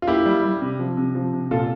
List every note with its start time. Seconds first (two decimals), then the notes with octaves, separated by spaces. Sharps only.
0.02 F4
0.07 A#3 E4 G4
0.26 G3
0.44 G3
0.61 C3
0.79 F3
0.97 C3
1.15 F3
1.33 C3
1.51 A#2 F4 A4